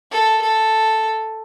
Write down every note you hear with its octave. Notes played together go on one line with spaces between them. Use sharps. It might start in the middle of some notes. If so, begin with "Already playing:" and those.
A4
A4